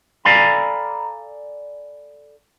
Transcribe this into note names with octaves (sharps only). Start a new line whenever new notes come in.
A4 D5 F5 G#5 A#5 B5